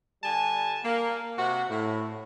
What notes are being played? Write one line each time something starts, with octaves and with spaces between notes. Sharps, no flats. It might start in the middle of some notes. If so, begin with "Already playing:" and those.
D3 G3 G#5 A5
A#3
C3 F#4
A2